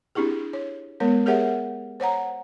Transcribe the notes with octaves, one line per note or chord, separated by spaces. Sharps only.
C4 D4 E4 G4 G#4
C#5
G#3 B3 A#4 C#5
G4 G#4 A#4 C#5 E5 F#5
C5 C#5 F#5 A#5